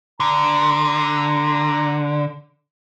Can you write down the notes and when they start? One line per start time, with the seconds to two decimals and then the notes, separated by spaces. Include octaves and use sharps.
0.20 D3 A#5